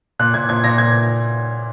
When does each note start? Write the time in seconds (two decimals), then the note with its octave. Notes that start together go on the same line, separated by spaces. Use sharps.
0.19 A#2 F#6
0.34 A#2 G#6
0.49 A#2 G#6
0.64 A#2 A#6
0.78 A#2 G#6